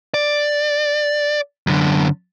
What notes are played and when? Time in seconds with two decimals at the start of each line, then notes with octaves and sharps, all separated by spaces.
0.14 D5
1.67 F#2 D3